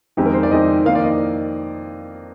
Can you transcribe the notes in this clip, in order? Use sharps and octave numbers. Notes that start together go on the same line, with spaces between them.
F2 D#3 G#3 C4 D#4 G4
A#4
C5
D5
F2 D#3 G#3 C4 D#4 D#5
F2 D#3 A#3 F5
D5
D#5